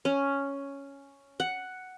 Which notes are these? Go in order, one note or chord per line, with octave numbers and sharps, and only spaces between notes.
C#4
F#5